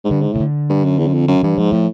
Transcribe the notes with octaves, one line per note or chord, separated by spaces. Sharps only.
G#2
G2 D3
G#2
A2 C#3
D3
G2
F#2
E2
F#2
F2
F#2
G2 E3
G#2 F3
A2 F3